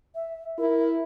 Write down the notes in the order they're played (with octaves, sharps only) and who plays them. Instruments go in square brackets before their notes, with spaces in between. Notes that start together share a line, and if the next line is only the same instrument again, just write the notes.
[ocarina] E5
[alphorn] E4 [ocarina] A#4